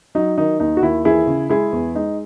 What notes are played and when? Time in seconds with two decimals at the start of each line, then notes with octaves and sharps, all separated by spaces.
0.15 F#3 D#4
0.38 D#3 D#4
0.60 D#2 D#4
0.77 F#4
0.82 D#2 E4
1.05 E3 E4 G#4
1.27 C#3
1.50 G#3 E4 G#4
1.72 E2
1.95 G#3 D#4